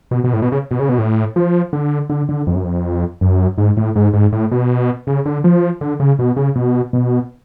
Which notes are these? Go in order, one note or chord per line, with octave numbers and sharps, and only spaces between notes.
B2
B2
A2
B2
C#3
B2
C#3
B2
A2
F3
D3
D3
D3
F2
F#2
F2
F#2
G#2
A2
G#2
G#2
A2
B2
C#3
D3
F3
D3
C#3
B2
C#3
B2
B2